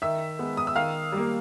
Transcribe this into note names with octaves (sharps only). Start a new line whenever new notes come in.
D#3 E5 E6
G#3 B3
D#6
E6
D#3 F5 F6
G3 A#3